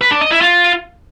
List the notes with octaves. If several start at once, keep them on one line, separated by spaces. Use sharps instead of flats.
B4
D4
D#5
E4
F4